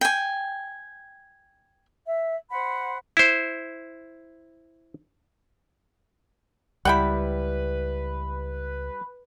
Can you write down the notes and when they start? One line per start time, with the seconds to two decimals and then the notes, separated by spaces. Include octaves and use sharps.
0.01 G5 G#5
2.07 E5
2.49 C5 F#5 B5
3.17 E4 C5
6.85 C#2 G3 E4 B4 F#5 G5 B5